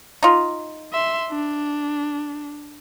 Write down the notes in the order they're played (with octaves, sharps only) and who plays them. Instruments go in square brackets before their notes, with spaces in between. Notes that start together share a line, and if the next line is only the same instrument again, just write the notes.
[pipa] D#4 F4
[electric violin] E5 C6
D4